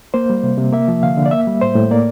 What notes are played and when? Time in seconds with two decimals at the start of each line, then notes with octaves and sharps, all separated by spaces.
0.14 A#3 C5
0.30 G3
0.43 C3
0.58 C3
0.73 A#3 E5
0.88 F3
1.03 D3 F5
1.17 D3
1.26 D5
1.31 A#3 E5
1.47 G3
1.62 A2 C5
1.76 A2
1.91 A#3 D5